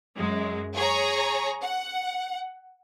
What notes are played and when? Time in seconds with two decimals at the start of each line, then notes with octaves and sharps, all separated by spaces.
0.17 F#2 G#3
0.75 G#4 C#5 A#5
1.62 F#5